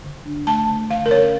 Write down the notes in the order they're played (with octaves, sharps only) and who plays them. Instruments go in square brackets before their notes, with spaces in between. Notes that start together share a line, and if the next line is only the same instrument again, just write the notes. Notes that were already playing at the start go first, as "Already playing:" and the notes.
[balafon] D3
D4
A3 A5
D3
D3 F5
A#4
C#4 C#5